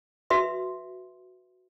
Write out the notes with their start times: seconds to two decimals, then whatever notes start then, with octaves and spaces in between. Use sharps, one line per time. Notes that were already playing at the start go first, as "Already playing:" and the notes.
0.30 F#4 B4 E5 C6